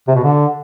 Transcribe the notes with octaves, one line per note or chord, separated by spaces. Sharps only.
C3
B2
D3